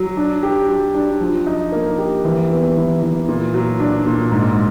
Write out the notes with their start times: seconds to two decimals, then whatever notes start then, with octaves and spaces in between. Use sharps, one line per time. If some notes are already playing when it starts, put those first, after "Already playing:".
Already playing: F#3
0.17 D4
0.43 G4
0.68 F#3
0.95 D4
1.20 F3
1.46 D#4
1.72 A#3
1.98 G4
2.24 E3
2.50 B3
2.76 E3
3.02 E3
3.28 A#2
3.54 F#3
3.80 D4
4.06 A#2
4.32 G#2